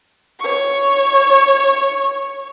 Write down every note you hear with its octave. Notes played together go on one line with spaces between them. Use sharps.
C#5 C#6